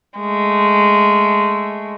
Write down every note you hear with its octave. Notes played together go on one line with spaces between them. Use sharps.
G#3 A3